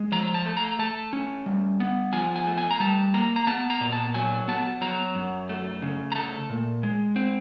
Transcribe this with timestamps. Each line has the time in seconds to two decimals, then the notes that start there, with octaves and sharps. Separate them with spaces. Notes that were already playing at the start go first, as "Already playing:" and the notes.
Already playing: G#3
0.12 F3 A#5
0.34 A5
0.45 A3
0.57 A#5
0.79 A3 A5
1.13 C#4
1.46 G3
1.80 B3
2.13 F3 G#5
2.36 G#5
2.47 A3
2.58 G#5
2.71 A#5
2.80 G3 A5
3.14 A#3 A#5
3.36 A#5
3.47 B3 A5
3.70 A#5
3.81 A#2
3.92 A5
4.14 F#3 G#5
4.48 B3 A5
4.81 F#3 A#5
5.15 F#2
5.49 A3
5.82 C#3
6.12 A#5
6.15 A3 A5
6.50 A#2
6.83 G#3
7.16 C4